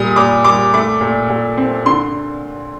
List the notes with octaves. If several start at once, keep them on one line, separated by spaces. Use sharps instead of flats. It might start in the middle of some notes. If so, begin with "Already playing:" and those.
Already playing: A#2 G3 D#6
A#2 D6
G3 D6
A3 D6
A#2
A#2
C4
D3 C6